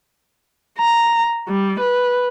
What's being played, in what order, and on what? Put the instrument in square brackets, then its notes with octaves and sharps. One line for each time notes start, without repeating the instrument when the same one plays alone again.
[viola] A#5
G3
B4